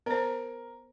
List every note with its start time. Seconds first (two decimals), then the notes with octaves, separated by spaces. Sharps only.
0.06 B3 A#4 C5